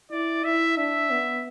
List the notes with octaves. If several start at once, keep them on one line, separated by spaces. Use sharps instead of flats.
E4 D5
E4 E5
D4 E5
B3